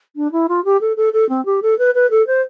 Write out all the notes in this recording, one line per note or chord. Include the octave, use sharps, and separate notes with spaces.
D4
E4
F4
G4
A4
A4
A4
C4
G4
A4
B4
B4
A4
C5